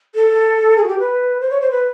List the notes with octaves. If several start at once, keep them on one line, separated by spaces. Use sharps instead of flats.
A4
G#4
F#4
G4
B4
C5
C#5
C5
B4